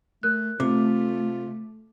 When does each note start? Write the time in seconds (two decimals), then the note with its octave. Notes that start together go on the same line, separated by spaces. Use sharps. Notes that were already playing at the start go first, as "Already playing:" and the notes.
0.23 A3 A#4 F#6
0.60 C3 A3 F4 D6